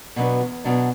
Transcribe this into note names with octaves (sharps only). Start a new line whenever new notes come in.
B2 F#3 B3 D4
E2
B2 F#3 B3 D4